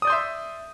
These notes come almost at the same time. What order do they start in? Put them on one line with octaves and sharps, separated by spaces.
D#6 D5 G6 C6 E5